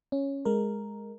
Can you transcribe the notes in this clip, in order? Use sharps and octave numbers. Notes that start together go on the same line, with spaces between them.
C#4
G#3 A#4